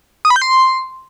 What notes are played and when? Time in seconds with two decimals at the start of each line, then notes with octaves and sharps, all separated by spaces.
0.25 D#6
0.30 B5
0.36 G6
0.42 C6